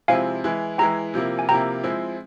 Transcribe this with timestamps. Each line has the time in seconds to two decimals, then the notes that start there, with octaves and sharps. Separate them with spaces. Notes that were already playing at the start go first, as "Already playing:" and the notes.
0.08 C3 F3 G#3 C4 E4 F5 G#5
0.44 E3 G#3 E4
0.78 E3 G#3 E4 G5 A#5
1.14 C3 F3 A#3 E4
1.39 G#5
1.49 C3 F3 A#3 E4 G5 A#5
1.84 F3 G#3 C4 E4